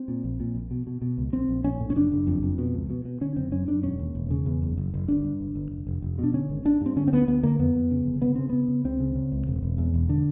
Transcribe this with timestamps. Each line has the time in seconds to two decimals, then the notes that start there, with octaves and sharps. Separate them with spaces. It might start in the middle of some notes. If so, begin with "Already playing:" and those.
Already playing: C4
0.08 A#2
0.24 A#1
0.40 A#2
0.55 A#1
0.71 B2
0.87 B2
1.02 B2
1.18 C#2
1.33 A#1 C4
1.49 A#1
1.64 A#1 C#4
1.80 A2
1.90 C#4
1.96 F#1 D4
2.12 F#1
2.27 F2
2.43 F2
2.58 B2
2.74 C#2
2.90 B2
3.05 B2
3.21 D3 C#4
3.36 F#1 C4
3.52 F#2 C#4
3.68 F#2 D4
3.83 E1 C#4
3.99 D#2
4.15 E1
4.31 C#3
4.46 E2
4.62 F#1
4.77 F#1
4.94 F#1
5.08 G1 D4
5.24 G2
5.40 G1
5.55 G1
5.71 F1
5.87 F1
6.02 F1
6.19 B2 D4
6.33 D3 C#4
6.50 G#1
6.65 G#1 D4
6.81 G2 C4
6.96 D3 C#4
7.08 C4
7.13 D2 B3
7.28 D2 B3
7.43 D3 A#3
7.59 F2 B3
7.75 F2
7.91 C#3
8.06 G1
8.22 C#3 B3
8.35 C#3 C4
8.49 C#3 B3
8.68 C#3
8.85 C#2 C4
9.00 C#3
9.15 C#3
9.32 C#2
9.47 E1
9.63 E1
9.78 E2
9.94 E1
10.09 D3